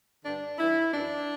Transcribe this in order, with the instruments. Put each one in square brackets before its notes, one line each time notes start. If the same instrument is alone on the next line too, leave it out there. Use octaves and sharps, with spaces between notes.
[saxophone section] G2 D3 D4
G2 E3 E4
F#2 E3 D4